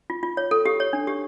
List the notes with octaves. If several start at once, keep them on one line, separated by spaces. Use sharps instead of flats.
F4
F4
C#5
A4
G4
C#5
D4
G4